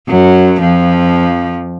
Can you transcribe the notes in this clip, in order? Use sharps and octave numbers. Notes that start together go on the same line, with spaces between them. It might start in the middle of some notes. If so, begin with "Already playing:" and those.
F#2 F#3
F2 F3